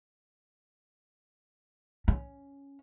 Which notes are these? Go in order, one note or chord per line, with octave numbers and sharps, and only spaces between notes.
C#4